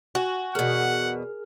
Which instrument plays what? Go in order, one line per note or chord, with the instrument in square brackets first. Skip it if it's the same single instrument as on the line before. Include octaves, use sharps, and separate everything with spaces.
[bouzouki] F#4 [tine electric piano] G#5
[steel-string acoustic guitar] E2 B2 [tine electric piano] G#4 A#4 F6 [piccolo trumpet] F#5